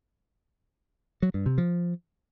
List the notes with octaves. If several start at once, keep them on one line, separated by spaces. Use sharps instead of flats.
F#3
G2
C3
F3